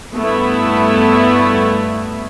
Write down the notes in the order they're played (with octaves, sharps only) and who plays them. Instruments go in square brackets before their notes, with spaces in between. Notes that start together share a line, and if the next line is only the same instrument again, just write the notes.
[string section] G2 A3 B3 E4